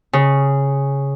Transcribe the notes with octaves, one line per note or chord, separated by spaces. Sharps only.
C#3